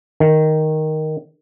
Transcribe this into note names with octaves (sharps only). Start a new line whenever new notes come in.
D#3